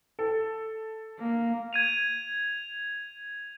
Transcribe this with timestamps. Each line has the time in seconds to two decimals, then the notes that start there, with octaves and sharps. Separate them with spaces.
0.19 A4
1.19 A#3
1.73 G#6 D#7 F7